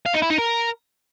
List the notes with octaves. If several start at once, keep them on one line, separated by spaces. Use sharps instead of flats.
F5
D#4
E4
D#4
A#4